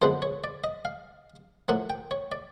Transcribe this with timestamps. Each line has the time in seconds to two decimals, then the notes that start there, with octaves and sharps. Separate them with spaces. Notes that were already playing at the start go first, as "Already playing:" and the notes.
0.02 F#2 D3 F3 G#3 B3 C5
0.22 C#5
0.44 D5
0.64 D#5
0.85 F5
1.68 A2 F3 A#3 F#5
1.90 G5
2.11 C#5
2.32 D5